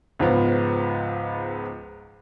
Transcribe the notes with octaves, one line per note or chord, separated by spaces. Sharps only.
C#2 G#2 F3 B3